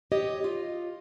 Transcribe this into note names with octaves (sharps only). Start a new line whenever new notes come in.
G4 C#5 D#5
F4